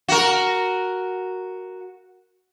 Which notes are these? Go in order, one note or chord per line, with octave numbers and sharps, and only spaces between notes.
F#4 A#4